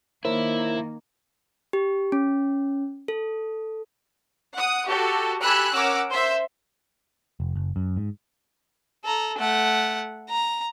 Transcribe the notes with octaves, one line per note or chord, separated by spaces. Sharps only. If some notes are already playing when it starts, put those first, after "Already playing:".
D#3 A#3 E4 A#4 C5 C#5
G4
C#4
A4
F#5 D#6
F#4 G4 A4
G4 A4 G#5 B5 E6 F#6
C#4 A#4 F#5 D6 E6
C5 E5
F1
F#1
F#2
G#2
A4 A#5
A3 F#5
A#5